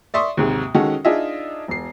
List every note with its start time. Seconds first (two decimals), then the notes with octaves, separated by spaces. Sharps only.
0.14 D5 E5 C6 C#6 D#6
0.37 D#2 G#2 C3
0.75 D#3 G#3 C#4 F#4 A4
1.05 D4 D#4 F4 G#4 D#5 E5
1.68 E1 C7